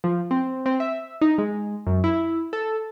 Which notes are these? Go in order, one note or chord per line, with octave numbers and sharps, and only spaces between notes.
F3
C4
C4
E5
D#4
G#3
F#2
E4
A4